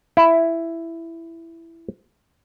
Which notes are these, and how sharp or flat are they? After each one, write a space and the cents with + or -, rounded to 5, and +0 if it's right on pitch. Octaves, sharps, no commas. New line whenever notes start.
E4 +10